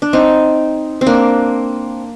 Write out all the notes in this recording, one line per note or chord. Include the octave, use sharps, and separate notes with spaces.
D4
C4 D#4
C4
A#3 D4